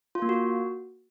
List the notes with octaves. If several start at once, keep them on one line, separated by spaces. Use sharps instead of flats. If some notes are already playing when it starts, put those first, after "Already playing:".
F4
A#3
F#4